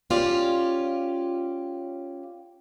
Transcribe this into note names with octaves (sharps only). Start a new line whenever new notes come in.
C#4 F4 G4 D5